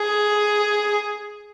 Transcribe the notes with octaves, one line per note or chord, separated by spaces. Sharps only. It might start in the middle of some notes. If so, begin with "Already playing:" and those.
Already playing: G#4